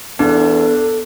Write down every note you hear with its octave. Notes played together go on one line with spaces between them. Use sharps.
E2 B3 D4 A4